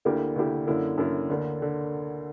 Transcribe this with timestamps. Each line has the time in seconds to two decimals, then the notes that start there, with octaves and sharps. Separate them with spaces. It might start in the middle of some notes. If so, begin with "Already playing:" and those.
0.05 D2 D3 A#3 E4 G4
0.36 D2 D3 A#3 E4 G4
0.67 F#2 D3 A#3 E4
0.98 F#2 D3 A#3 E4
1.29 D2 D3 A#3
1.62 D3